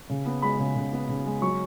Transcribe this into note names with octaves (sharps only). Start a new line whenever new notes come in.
C#3
B3
G#3 B5
C#3
C#3
B3
C#3
G#3
F#3 C#6